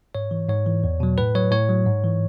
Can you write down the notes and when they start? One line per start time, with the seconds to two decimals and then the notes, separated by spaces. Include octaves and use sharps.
0.15 G#2 C#5
0.31 E3
0.48 G#2 C#5
0.66 E3
0.84 E2
1.00 B2 F#3
1.17 A2 B4
1.35 F#3 C#5
1.51 A2 C#5
1.69 F#3
1.86 G#2
2.04 E3